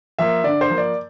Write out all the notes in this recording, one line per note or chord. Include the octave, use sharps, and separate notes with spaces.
F3 A#3 E5
D3 D5
C5
F3 A#3
D5